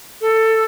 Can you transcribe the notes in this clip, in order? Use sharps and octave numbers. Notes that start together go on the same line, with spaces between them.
A4